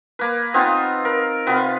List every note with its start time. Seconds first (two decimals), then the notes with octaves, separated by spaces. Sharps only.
0.19 A#3 B4
0.54 B3 C4 D#4 F4
1.05 A#4
1.47 C3 B3 F4 B4